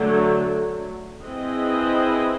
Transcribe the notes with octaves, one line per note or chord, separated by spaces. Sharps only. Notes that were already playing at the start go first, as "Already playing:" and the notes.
Already playing: D3 F#3 A3
C4 E4 G#4 B4 D#5